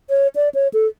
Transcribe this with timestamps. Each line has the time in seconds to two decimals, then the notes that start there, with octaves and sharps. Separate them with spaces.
0.10 C#5
0.36 D5
0.55 C#5
0.73 A4